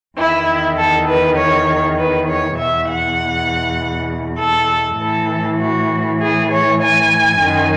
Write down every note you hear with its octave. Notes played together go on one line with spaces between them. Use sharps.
E2 D#3 E4
A4
B4
C#5
B4
C#5
E2 B2 E5
F#5
A4
A2 E3 A4
F#4
G#4
C#5
G#5
F#2 D#3